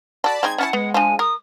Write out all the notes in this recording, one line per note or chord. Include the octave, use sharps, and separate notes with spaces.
F#4 A4 D5 A5 B5
G#3 C4 D#4 G#6
C#4 D#4 E4 F#5 A5
G#3 B3
F3 D4 G#5
A#4 D#6